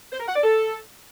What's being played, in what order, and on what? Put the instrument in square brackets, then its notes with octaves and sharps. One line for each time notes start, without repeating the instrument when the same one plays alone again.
[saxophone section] C5
A#4
F#5
D5
A4